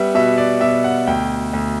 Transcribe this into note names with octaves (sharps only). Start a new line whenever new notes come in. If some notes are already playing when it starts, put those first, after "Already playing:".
Already playing: G3 B3 E5
B2 E5
D5
B2 E5
F#5
D2 G5
D2